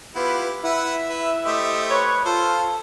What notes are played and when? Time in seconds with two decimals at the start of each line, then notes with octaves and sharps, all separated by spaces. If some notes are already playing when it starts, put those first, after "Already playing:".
0.15 B3 E4 F4 G4 B4
0.64 E4 B4 E5 F#5
1.09 B4
1.45 A3 G4 C5 D#5
1.91 B4 C#5
2.25 F4 A4 C5